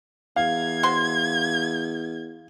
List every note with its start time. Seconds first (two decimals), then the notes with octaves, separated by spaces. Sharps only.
0.36 E2 F5 G#6
0.83 F#4 C5 C6